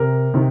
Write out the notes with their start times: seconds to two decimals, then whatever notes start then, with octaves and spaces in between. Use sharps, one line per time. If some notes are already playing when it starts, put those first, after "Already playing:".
Already playing: C3 A#4
0.34 C3 D#3